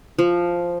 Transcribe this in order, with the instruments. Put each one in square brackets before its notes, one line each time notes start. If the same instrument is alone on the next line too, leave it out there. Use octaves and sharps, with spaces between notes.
[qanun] F3